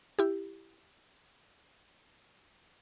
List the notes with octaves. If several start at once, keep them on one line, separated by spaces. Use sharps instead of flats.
E4 G4